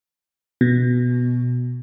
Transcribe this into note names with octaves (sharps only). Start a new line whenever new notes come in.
B2